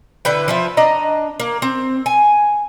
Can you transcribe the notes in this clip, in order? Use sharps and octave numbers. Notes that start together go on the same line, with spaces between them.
D3 E4 B4 G5
F3 B4 E5
D4 D#5 A#5
A#3
C4
G#5